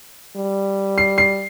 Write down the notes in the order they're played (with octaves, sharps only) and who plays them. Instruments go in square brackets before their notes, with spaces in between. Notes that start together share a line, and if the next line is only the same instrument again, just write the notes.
[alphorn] G3
[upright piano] C7
C7